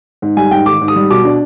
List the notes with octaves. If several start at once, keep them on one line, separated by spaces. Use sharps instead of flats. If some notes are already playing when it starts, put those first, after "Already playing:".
G#2
G3 G#5
G#2 G5
D#3 D6
G#2
D#6
G3
B2 D6
D4